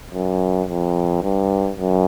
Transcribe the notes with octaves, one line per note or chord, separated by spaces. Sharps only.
F#2
F2
G2
F#2